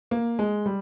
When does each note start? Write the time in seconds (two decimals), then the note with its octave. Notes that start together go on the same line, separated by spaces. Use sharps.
0.11 A#3
0.39 G#3
0.66 G3